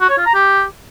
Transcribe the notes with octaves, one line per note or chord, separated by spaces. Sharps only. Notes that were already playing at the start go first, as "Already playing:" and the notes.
F#4
C#5
F4
A#5
G4